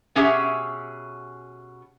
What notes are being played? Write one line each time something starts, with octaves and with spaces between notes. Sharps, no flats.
B2 C#4 G4 G#4 E5